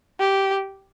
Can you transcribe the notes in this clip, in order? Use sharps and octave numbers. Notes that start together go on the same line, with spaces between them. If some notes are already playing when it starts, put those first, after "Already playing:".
G4